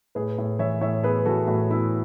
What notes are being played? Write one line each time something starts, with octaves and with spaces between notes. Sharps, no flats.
A2 G#4 B4
A2
E3 C#5 E5
A2 C#5 E5
B3 G#4 B4
E3 F#4 A4
A2 F#4
B3 E4